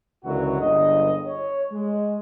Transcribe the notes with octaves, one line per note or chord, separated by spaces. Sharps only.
C#2 A#2 D3 E3 F#3 F#4
G1 C#2 G2 D#5
C#5
G#3